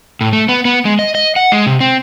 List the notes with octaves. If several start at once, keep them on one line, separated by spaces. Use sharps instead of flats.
A2
A3
B3
B3
G#3
D#5
D#5
F#5
G#3
C3
C4